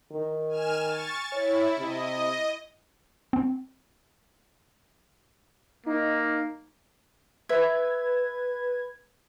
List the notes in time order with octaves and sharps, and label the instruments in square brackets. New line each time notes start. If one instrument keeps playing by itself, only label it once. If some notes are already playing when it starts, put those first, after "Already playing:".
[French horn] D#3
[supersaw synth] G#5 F6 E7
C#6 A6
[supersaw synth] E4 [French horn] C#5
[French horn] C3 [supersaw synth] D#5
[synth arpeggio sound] C4
[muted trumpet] A#3 [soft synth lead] D#4
[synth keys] B4 G#6 [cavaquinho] E5